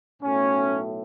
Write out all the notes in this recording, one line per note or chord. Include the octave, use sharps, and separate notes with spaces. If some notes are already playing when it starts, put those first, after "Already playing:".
B1 A2 F#3 A3 C#4